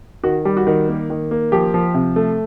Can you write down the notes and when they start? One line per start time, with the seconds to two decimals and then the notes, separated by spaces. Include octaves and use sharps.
0.24 D#3 F#4
0.45 G3
0.57 F#4
0.67 D#3
0.89 A#3
1.10 D#3
1.31 A#3
1.52 F3 G4
1.74 F3
1.94 C3
2.16 A3